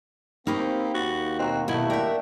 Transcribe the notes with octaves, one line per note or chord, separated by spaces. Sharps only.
A#3 C4 D#4 G4 F5 B5 C#6
D#2 F#4 F#5
B2 C4 F#4 A#5
B2 A3 E4 E5
D4 G4 A#4 E5 F#5